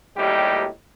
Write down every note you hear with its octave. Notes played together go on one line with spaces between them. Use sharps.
G#1 D#2 A2 G3 D#4 G4